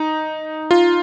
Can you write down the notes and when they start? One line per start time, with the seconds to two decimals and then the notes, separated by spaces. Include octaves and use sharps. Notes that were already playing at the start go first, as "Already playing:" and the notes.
Already playing: D#4
0.71 F4